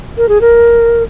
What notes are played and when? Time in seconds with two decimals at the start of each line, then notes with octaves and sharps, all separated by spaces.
0.17 A#4
0.29 G#4
0.41 A#4